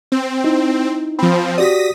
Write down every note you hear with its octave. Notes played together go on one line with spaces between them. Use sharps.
C4
D#4 E4
F3 C4 B5
F#4 G4 D5 D#6 A#6 B6